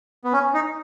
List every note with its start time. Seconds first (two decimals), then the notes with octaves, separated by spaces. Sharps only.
0.24 B3
0.33 C#4
0.54 D#4